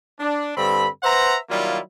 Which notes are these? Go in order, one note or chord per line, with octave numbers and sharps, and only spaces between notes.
D4
G2 D3 C4 A4 B5
B4 C5 E5 F#5 A#5
D#3 F#3 G3 A#3 E4 F4